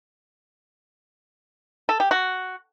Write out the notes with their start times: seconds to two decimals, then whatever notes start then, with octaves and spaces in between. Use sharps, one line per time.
1.89 A4
2.00 G4
2.11 F#4